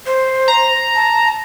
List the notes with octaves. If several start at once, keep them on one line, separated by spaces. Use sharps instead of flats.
C5
A#5
A5